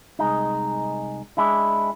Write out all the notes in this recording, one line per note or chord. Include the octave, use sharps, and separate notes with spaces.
C2 G#3 D#4
G#3 D4 E4